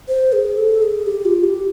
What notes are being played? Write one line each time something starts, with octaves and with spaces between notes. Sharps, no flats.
C5
G#4
A4
G#4
G4
F4
G4